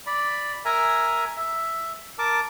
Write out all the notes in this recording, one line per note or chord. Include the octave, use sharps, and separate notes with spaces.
D5 B5
A#4 E5 G#5 A#5
E5
A#4 A5 D6